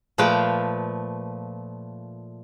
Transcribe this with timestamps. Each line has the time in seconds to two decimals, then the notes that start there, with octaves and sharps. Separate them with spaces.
0.18 A#2 F3 A3 B4 F5 G5